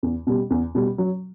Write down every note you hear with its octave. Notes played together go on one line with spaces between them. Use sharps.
E2
B2 G3
E2
B2 G3
F#3